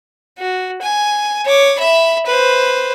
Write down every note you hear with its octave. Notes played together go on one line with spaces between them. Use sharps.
F#4
G#5
C#5 D6
E5 B5
B4 C5